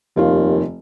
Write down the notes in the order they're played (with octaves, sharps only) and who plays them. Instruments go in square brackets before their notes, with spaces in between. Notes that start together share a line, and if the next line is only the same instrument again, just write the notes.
[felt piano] F1 F4 F5 [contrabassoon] D#2